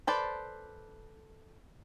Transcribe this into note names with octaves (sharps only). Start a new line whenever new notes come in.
A4 B4 C5 D5